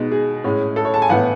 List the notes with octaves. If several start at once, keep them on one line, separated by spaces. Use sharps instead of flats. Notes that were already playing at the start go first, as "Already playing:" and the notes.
Already playing: B2 G#3 D#4
G#4
A2 G#3 C#4
A4
C#5
A5
G#5
A2 E3 B3 E4 F#5